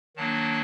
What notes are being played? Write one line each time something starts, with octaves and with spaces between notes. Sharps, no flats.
D#3 F#3 A#3 D4 A5